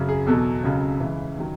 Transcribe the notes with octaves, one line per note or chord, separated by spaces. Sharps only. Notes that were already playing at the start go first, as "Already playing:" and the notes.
Already playing: F#2 C#3 F#3
G#4
E2 B2 F#3 A4
C#2 C#3 F#3
C#2 C#3 E3
D#3 F#3